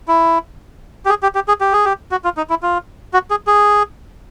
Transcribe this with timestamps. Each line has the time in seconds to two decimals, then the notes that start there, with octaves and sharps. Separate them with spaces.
0.08 E4
1.05 G4
1.09 G#4
1.23 G4
1.35 G4
1.48 G#4
1.61 G4
1.73 G#4
1.85 G4
2.11 F#4
2.24 F4
2.37 D#4
2.50 E4
2.63 F4
3.13 F#4
3.30 G#4
3.47 G#4